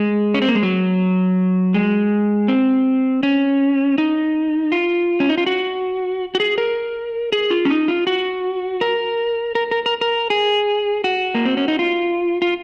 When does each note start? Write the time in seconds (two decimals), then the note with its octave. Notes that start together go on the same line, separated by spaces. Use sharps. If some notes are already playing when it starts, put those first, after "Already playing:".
Already playing: G#3
0.34 C#4
0.42 C4
0.48 A#3
0.55 G#3
0.63 F#3
1.74 G#3
2.48 C4
3.23 C#4
3.98 D#4
4.72 F4
5.20 C#4
5.29 D#4
5.38 F4
5.46 F#4
6.35 F#4
6.40 G#4
6.58 A#4
7.32 G#4
7.50 F4
7.65 C#4
7.70 D#4
7.88 F4
8.07 F#4
8.81 A#4
9.55 A#4
9.71 A#4
9.86 A#4
10.01 A#4
10.30 G#4
11.04 F#4
11.35 A#3
11.45 C4
11.57 C#4
11.68 D#4
11.79 F4
12.42 F4